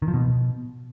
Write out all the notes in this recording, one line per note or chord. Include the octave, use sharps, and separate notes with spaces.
D#3
F3
B2